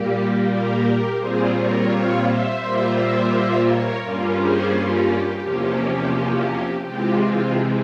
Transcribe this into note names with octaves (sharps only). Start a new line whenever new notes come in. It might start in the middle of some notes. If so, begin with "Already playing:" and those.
Already playing: A#2 G3 A#3 G4
G4 A#4
A#2 G3 C4 F4 G#4 C5
A#4 C#5
C#5 F5
C5 E5
A#2 G3 A#3 F4 C5 E5
C5 E5
A#4 C#5
G2 G3 A#3 C#4 F4
G#4 C5
G4
G4
E2 C3 F3 A#3 C#4 G4
C3 E3 G#3 C4 F4 G4
F4